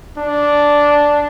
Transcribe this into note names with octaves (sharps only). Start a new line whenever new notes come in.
D4